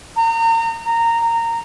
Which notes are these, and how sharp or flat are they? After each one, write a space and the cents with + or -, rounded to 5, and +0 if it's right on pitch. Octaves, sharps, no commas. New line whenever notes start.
A#5 -35
A#5 -15